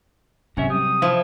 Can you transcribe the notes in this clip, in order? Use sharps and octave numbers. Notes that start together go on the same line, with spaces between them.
G#2 C3 F#3 C#4 E5
G3 D#6
F3 E4